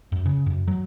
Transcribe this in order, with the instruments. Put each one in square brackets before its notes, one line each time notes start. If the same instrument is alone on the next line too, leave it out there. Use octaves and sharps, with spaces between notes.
[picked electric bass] F#2
C#3
F#2
F#3